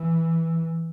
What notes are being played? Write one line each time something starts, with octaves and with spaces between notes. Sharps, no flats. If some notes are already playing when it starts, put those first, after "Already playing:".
Already playing: E3